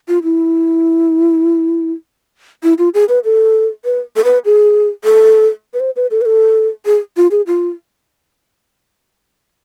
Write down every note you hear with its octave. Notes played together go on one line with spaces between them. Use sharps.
F4
E4
E4
F4
G#4
B4
A4
B4
A4
B4
G#4
A4
B4
C5
B4
A4
B4
A4
G#4
F4
G#4
F4